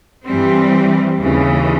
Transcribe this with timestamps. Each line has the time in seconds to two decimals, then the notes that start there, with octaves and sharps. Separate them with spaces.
0.24 G2 E3 G3 C4
1.20 D#2 C#3 E3